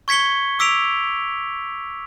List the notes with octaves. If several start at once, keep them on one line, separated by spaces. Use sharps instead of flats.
C#6 G#6 B6 C#7 G7
D6 E6 B6 D7 F7